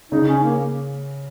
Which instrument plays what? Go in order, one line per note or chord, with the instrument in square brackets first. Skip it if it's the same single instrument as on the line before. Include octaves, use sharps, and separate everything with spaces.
[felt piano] C#3 [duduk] D#4
[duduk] C#4
A#3